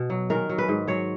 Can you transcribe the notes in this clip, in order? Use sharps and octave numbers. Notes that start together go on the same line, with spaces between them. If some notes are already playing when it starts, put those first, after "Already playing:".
Already playing: B2
F#3
D#3 A#4
F#3
B4
G#2
F#3 C#5